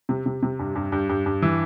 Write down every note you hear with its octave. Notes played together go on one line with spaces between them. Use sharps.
C3
C3
C3
G2
G2
G2
G2
G2
E3